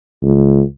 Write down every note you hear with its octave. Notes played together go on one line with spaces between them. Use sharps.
C#2